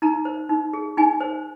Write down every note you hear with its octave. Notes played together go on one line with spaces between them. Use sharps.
D#4 A#5
C5
D#4
G#4
D#4 G#5
C5